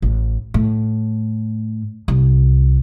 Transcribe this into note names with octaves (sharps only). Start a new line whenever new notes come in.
A1
A2
C2